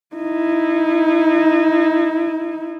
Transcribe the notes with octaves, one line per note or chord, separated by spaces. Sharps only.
D#4 E4